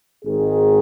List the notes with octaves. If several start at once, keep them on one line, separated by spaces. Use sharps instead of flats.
G#1 G#2 D#3 G#4